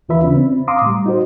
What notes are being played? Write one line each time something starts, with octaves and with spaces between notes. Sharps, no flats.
D#2 E3 F4 B4 E5 B5
C#3 C#4 D4
C4
F5 A#5 C6 D6 D#6
A2 G3
D#4 F#4 C5